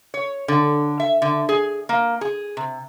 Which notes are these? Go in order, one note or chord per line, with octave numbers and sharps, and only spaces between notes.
C#5
D3
E5
D3
G#4
A#3
G#4
C3